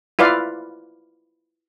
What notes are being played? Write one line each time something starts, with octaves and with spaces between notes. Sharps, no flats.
E4 F4 B4 D5 F5